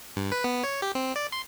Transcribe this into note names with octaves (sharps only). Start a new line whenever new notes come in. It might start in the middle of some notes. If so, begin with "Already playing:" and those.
G2
B4
B3
C#5
G4
C4
D5
C6